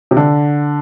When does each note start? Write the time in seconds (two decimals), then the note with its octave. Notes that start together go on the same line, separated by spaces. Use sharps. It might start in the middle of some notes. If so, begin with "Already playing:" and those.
0.11 C3
0.17 D3